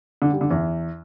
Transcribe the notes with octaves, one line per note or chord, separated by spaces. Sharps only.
D3
G3
D3
E2